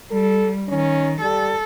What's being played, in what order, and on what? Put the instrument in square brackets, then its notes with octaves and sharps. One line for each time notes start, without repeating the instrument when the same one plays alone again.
[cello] G3 [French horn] A4
[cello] D#3 [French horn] C#4
[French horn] G3 [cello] A4